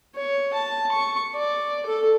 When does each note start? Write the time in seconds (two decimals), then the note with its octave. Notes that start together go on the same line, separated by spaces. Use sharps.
0.15 C#5
0.53 A5
0.91 C#6
1.35 D5
1.86 A4